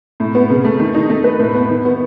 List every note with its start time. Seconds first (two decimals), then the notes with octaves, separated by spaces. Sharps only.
0.20 A2
0.35 B3
0.50 C#3
0.65 A3
0.80 D#3
0.95 D#4
1.09 A3
1.24 B4
1.39 A2
1.55 B3
1.70 D#3
1.85 B3